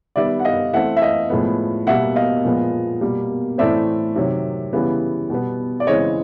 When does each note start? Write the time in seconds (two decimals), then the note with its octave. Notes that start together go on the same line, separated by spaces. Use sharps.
0.16 D#3 G3 B3 D5 E5
0.39 F#5
0.45 D#5 F5
0.73 E3 A3 C4 E5 F#5
0.97 E5
1.02 D#5 F5
1.30 A2 F3 G#3 B3
1.87 B2 G3 A#3 E5 F#5
2.16 D#5 F5
2.44 A#2 F3 G#3 B3
3.01 B2 G3 A#3
3.58 A2 E3 A3 C4 D5 E5
4.16 C3 D#3 F#3
4.73 C#3 E3 G3 B3
5.30 B2 G3 B3
5.80 D5
5.87 C#3 E3 G#3 C4 C#5 D#5